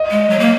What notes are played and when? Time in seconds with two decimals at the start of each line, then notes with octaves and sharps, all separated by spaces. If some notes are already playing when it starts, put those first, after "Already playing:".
Already playing: D#5
0.10 G#3
0.30 F#3
0.39 A#3